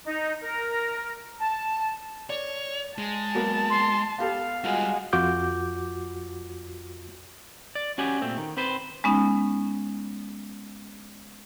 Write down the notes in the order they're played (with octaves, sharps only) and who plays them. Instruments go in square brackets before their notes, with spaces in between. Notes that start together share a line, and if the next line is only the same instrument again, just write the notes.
[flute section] D#4
A#4
A5
[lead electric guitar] C#5 [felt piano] D5
[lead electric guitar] G#3 [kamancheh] A5
[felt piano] F#3 A#3 B3
[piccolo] C6
[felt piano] B3 G4 A4 [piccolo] F5
[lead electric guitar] G3 F4 [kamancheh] G#3 F#4
[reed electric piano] F2 F4 F#4 D6 G6
[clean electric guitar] D5
C#4 F#4 G4 G#5
A#2 A3 C4
D#3
C4 B4 C5
[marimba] G#3 B3 C#4 D#4